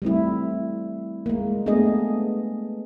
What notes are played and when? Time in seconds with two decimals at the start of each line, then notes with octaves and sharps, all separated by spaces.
0.02 G3 A3 C4 E4
1.26 G#3 A#3
1.66 A3 B3 D4 G#4 D#5